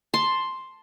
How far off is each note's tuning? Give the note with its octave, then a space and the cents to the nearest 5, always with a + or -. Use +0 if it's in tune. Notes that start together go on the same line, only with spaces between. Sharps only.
A5 +0 C6 +5